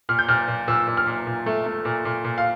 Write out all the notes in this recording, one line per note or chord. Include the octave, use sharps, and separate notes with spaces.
A#2 F6
G6
A#2 F6
A#2
A#2 E6
A#2
F6
A#2
A#2
A3
A3
A#2
A#2
A#2
F5